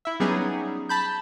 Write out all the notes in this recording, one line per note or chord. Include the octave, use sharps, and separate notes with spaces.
E4 E5
F#3 G3 B3 C#4 D#4 G#4
A5 B5 G6